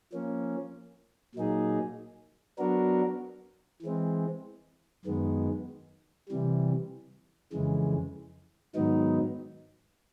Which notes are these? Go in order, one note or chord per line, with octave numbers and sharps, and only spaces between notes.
F3 A#3 C#4
A#2 F#3 A#3 D#4 G#4
F#3 B3 D4 F#4 A#4
E3 G#3 C4
F#2 D#3 G#3 B3
C3 E3 G3
F2 C#3 E3 G#3
G#2 D#3 F#3 B3 D#4